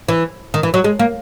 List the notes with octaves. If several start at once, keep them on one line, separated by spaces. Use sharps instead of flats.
E3
D#3
E3
F#3
G#3
A#3